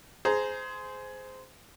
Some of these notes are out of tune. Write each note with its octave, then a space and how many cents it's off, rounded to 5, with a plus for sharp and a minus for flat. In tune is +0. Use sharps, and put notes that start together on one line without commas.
G#4 +15 C5 -15 A#5 +0